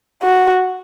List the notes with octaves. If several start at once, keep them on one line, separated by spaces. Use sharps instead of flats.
F#4